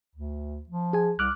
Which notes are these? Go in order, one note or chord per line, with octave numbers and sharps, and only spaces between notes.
D2
F3
G#4 G#5
C2 D6 F6 F#6